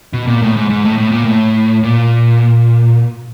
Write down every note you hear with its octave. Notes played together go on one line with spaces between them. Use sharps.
B2
A#2
A2
G#2
G#2
A2
A2
A#2
A2
A#2